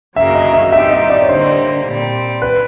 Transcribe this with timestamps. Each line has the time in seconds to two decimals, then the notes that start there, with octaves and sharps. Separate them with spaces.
0.16 F#2 C#3 F#3 A#3 E5
0.35 D#5
0.53 E5
0.72 G3 C4 D#4 G4 E5
0.91 D#5
1.10 D5
1.22 C#5
1.29 D3 G3 A#3 C5
1.85 A#2 G3 C4
2.42 B4